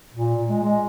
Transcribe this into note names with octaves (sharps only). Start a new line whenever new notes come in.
A#2
G#3
G#3